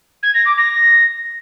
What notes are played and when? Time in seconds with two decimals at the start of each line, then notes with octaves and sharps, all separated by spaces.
0.23 G#6
0.34 A#6
0.46 D6
0.57 A#6